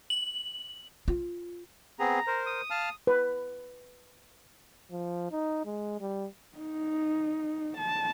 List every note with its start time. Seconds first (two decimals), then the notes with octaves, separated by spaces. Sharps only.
0.10 F#7
1.08 F4
2.00 B3 C4 G#4 A#5
2.27 A#4 C5
2.47 D#6
2.70 F5 A5 F6
3.07 B4
4.91 F3
5.32 D#4
5.65 G#3
6.00 G3
6.58 D#4
7.78 A5